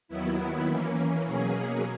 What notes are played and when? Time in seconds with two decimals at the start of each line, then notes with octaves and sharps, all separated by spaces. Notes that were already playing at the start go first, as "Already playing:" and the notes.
0.08 D#2 D#3 F#3 B3 E4
0.68 E3 A#3 C#4
1.26 B2 F#3 A#3 C#4 G#4